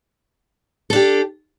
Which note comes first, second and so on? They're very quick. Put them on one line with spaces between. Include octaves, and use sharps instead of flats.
A4 D4 G4